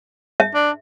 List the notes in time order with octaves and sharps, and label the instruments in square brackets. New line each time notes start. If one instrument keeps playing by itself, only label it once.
[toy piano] E5
[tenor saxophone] D4